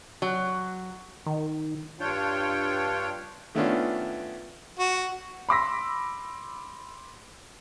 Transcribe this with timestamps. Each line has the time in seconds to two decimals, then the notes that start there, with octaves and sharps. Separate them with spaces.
0.22 F#3
1.26 D#3
2.00 G2 D4 F4 C#5 G5
3.55 D#3 A3 B3 C#4 D4 F4
4.79 F#4
5.49 B5 C6 D6 E6 A#6 B6